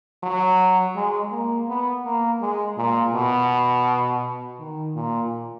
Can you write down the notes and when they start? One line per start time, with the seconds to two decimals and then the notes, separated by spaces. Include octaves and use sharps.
0.23 F#3
0.95 G#3
1.32 A#3
1.69 B3
2.05 A#3
2.41 G#3
2.77 A#2
3.14 B2
4.59 D#3
4.95 A#2